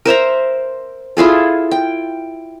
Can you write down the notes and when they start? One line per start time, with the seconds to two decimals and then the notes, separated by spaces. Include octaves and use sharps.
0.05 A#4 C5 E5 A#5
1.17 E4 F4 G#4 A4
1.71 G5